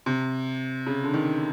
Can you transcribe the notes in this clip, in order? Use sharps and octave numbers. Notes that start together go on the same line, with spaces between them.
C3
C#3
D3
D#3